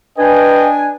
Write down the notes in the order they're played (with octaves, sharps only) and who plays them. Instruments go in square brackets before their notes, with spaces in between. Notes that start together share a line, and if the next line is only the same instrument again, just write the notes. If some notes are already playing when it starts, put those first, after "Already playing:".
[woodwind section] D4 G#5 [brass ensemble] B4 D#5 G5